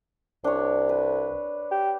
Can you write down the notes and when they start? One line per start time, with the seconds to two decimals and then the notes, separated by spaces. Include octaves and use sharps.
0.44 C2 D4 C#5
0.89 B4
1.71 G4